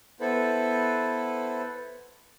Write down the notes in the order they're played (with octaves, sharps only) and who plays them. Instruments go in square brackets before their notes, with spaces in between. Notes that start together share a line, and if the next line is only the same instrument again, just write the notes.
[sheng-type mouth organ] B3 E4 A4 B4 C5